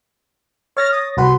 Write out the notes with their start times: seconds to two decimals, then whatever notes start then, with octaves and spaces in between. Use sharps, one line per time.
0.77 C#5 F6 A6 A#6
0.91 D#6
1.17 C2 F#4 B4 C6